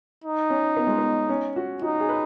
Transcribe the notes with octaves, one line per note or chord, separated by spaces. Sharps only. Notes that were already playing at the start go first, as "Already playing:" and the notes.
D#4
C#4
B3
G#3
B3
C#4
F#4
D#4 F#4
G#4
B4